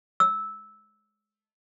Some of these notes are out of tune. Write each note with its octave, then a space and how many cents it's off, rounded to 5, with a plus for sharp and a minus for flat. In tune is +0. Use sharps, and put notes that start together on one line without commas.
E6 -10